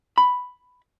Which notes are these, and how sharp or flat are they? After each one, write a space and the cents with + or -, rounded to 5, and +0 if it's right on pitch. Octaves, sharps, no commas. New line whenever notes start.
B5 +5